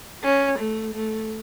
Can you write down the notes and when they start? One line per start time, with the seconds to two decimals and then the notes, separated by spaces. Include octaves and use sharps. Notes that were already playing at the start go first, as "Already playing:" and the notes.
0.24 C#4
0.59 A3
0.94 A3